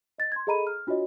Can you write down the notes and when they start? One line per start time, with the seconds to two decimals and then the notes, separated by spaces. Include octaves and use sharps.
0.18 D#5 A6
0.32 C6 G#6
0.47 G#4 A4 D#5 A#5 B5 D#7
0.67 F6
0.87 D4 F4 F#4 C#5 D#5